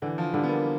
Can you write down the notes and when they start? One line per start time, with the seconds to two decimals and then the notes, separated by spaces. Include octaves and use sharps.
0.02 D3 E3
0.18 F3
0.33 D3 G3
0.43 B3
0.49 A#3